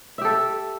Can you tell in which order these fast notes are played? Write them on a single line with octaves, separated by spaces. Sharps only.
E5 G4 A4